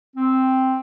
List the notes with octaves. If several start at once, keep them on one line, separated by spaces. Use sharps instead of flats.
C4